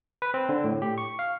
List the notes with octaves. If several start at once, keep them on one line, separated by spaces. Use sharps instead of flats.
B4
C4
D3
A2
G4
C#6
F5